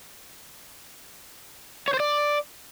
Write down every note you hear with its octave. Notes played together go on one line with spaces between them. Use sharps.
C#5
C5
D5